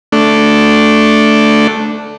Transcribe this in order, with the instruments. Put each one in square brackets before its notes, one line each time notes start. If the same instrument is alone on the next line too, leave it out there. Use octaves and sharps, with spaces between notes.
[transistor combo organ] A3 D4